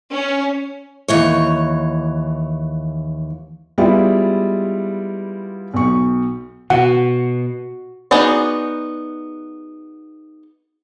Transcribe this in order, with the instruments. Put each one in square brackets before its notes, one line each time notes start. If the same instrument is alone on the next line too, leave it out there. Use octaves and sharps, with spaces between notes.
[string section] C#4
[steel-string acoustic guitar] D#2 E3 C#5
[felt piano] G3 G#3 B3 E4 F4 D5
B1 C#6
[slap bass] B2 [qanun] F#4 [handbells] F#5
[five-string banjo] B3 D#4 F#4 G#4 D5